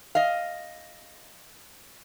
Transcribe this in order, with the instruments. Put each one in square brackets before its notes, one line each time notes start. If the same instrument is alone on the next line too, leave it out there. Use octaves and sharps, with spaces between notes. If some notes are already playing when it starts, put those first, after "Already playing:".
[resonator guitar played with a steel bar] D#5 F5